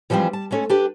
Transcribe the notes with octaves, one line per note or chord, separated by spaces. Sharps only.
E3 F3 G3 G#3 C4
A5
G#3 A3 C#4 A4
D4 G4 B4